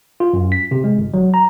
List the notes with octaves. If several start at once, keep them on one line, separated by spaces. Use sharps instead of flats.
F4
F#2
B6
C3
G#3
G1
F#3
A#5